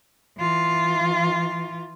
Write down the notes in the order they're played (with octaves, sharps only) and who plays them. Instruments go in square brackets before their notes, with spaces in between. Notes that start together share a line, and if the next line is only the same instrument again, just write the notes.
[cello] E3 F4